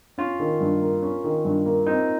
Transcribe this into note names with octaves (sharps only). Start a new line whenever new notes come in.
C#4 F4
D#3
G2
A#3
C#4
D#3
G2
A#3
C4 D#4